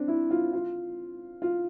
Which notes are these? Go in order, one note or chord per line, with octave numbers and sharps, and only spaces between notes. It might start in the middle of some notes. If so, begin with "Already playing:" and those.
Already playing: C4 D4
E4
F4
F4
F4